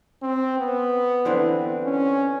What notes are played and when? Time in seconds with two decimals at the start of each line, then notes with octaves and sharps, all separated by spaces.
0.22 C4
0.58 B3
1.25 D3 E3 C4
1.84 C#4